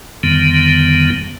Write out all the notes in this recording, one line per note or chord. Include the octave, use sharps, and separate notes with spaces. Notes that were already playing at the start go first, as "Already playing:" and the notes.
F2 D3 D#3 G3 B3